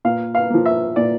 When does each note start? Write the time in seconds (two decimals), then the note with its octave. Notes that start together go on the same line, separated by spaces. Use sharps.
0.05 A#2 F5
0.35 F5
0.50 F3 A#3
0.66 E5
0.96 A#2 D5